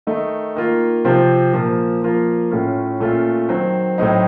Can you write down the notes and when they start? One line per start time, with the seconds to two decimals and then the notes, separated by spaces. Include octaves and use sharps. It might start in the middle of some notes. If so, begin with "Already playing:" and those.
0.07 D#3 A3 D#4
0.55 D#3 A#3 F4
1.05 C3 F3 C4 F4
1.53 A#2 F3 A#3
2.02 F3 A#3 F4
2.51 A2 A3 C#4 F4
3.00 A#2 A3 C#4 F4
3.49 D#3 F#3 C4
3.98 A2 F#3 C4 D#4